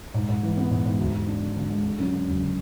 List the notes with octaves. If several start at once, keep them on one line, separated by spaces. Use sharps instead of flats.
G#2
G#2
E3
B3
G#2
G#2
D2
D2
D4
D3
D3
G#3
D3
F#2
D3
F#1
D3